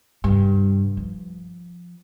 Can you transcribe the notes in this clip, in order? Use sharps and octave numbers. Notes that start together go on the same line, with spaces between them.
G2 C3
F3